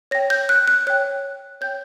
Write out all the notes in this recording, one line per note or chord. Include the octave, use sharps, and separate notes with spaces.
C#5 G5 A#6
G6
F#6
F#6
C#5 G5 F#6
C#5 G5 G6